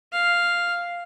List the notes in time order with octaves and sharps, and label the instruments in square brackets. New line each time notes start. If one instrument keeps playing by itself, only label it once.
[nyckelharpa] F5